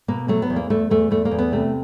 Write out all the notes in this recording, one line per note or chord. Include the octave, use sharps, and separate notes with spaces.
B2 A#3
F#3 A3
B3
E2
A#3
E2 A3
E2 A3
E2 A3
A#3
E2
B3
C3 A3